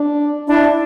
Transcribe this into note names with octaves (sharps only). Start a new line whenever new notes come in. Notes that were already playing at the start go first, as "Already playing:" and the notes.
Already playing: D4
D4 E4